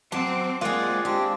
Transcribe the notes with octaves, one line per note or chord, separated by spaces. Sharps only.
F#3 C4 A5 D6
G#3 A#3 C4 F4 G#4 D5 F#5
C4 D4 G4